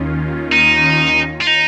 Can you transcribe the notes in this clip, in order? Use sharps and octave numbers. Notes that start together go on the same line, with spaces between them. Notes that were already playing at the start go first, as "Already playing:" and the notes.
Already playing: D#2 D#3 C#4 F4
D#4
F4
D#4